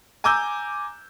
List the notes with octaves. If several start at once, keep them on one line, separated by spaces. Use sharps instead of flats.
G#5 A#5 D6 E6 G6